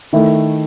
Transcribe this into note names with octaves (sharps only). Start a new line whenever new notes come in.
D#3 A3 E4